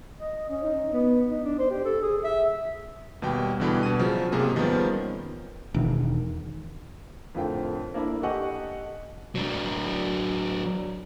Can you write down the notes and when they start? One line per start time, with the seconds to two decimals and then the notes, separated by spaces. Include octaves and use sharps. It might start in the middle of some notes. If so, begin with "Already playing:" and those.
0.20 D#5
0.49 C#4
0.63 D#4
0.93 B3
1.31 D#4
1.44 D4
1.59 C5
1.70 G4
1.85 A4
2.02 G#4
2.24 E5
3.22 D#2 B2 G3 G5
3.60 B2 D3 E3 G3 G4
3.83 B2 D4 D#7
3.99 C#3 F3 F#3
4.32 G#2 C3 A#3 G#4
4.56 D#3 F3 G3 B3 C#4
5.74 E1 D#3
7.34 F2 A2 D3 F4 A#4 G5
7.94 A#3 D4 E4 A4
8.23 G4 A4 D#5 F#5 G#5 C#6
9.35 F#3 D4